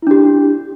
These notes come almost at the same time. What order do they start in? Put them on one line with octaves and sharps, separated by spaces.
E4 D4 G4